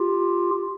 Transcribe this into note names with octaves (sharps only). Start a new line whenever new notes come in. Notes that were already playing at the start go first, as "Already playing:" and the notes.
Already playing: F4 G4